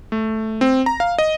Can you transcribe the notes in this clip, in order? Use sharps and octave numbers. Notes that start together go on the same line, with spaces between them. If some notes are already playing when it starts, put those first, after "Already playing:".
A3
C4
A#5
F5
D#5